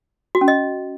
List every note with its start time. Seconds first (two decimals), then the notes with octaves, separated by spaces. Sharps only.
0.35 F#4
0.41 C#4
0.48 D#5